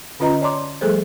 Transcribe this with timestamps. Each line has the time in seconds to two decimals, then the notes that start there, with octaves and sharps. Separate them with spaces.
0.20 D3 C#4 F4 B4 D#5 A#5
0.41 C#5 D5 A5 A#5 C6 D6
0.81 F3 G3 A3 G#4 A4 C5